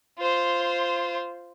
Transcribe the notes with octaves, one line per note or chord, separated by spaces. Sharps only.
F4 C5